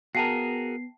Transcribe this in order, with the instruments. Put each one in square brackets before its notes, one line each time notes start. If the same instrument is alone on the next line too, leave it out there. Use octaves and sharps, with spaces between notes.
[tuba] B3 [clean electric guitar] F#4 G#4 A#4 [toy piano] F5 G5 A5 [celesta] C7